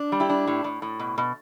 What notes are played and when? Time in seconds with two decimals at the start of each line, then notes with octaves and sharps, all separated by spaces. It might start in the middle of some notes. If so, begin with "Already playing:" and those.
Already playing: D4
0.12 G3
0.20 E4 G4
0.29 D4
0.48 A2
0.64 A2
0.82 A2
1.00 B2
1.18 B2